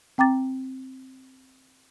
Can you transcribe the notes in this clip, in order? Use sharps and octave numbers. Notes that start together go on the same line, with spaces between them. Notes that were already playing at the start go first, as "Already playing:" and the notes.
C4 G5 A#5 D6 A6